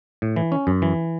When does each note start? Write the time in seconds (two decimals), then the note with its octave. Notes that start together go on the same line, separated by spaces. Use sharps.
0.22 A2
0.36 E3
0.52 C#4
0.67 F#2
0.82 E3